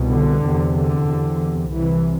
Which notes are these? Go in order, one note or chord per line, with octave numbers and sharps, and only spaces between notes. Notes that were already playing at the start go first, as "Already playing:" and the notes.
Already playing: C2 B2
D3
E2 C3
D3
E2 C3
C2 C3 E3